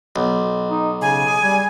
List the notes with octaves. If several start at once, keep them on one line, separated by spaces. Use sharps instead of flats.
B1
D#4
C#3 G#5
G#4
G3